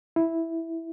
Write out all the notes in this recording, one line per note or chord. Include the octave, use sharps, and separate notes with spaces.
E4